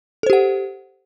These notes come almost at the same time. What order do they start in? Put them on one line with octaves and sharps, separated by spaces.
A4 C5 G4 F#5